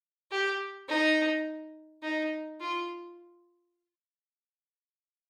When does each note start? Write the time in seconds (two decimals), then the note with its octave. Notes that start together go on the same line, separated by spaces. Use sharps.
0.31 G4
0.88 D#4
2.03 D#4
2.60 F4